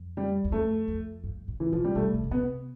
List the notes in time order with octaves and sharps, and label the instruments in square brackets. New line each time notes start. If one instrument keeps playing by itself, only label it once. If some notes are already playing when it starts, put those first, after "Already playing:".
Already playing: [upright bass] F2
[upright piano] G3
[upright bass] E2
[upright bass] F2 [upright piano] A3
[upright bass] F2
G2
A2
[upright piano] E3
[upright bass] B2 [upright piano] F3
[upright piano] G3
[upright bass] C3 [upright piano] A3
[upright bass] E3
D3
[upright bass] C3 [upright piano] B3